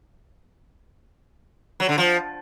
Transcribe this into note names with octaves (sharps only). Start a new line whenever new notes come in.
F#3
D3
F3